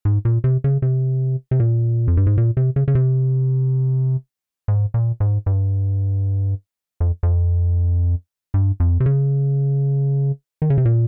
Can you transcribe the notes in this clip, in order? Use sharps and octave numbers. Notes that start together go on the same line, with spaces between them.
G#2
A#2
C3
C#3
C3
C3
A#2
F2
G2
G#2
A#2
C3
C#3
C#3
C3
G#2
A#2
G#2
G2
F2
F2
G2
F2
C3
C#3
D#3
C#3
C3
A#2